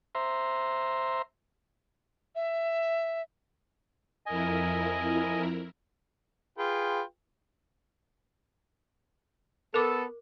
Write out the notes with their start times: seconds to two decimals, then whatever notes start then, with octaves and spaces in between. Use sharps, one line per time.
0.15 C5 E5 A#5 C6
2.35 E5
4.26 F2 E4 A#4 D#5 G#5
6.58 F4 G#4 B4 G5
9.74 B3 A4 A#4 D6